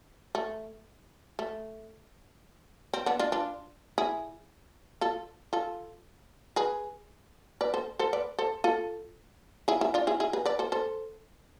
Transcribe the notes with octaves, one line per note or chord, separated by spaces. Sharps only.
A3
A3
C4
B3 D4
D4 F4
D4 F4
E4 G#4
F4 A4
F4 A4
G#4 B4
B4 D5
A4 C5
A4 C5
B4 D5
A4 C5
F4 A4
E4 G#4
E4 G#4
D4 F4
E4 G#4
E4 G#4
G#4 B4
B4 D5
A4 C5
A4 C5